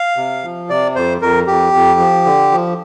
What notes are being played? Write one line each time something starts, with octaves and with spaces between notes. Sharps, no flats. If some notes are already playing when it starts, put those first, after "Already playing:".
Already playing: F5
C3
F3
C3 D5
F2 C5
F2 A#4
F2 G4
F2
F3
D3
F3